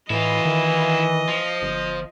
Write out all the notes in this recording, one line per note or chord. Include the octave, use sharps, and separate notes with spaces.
A2 E3 E4 F4 D#5
D#3
F3
G1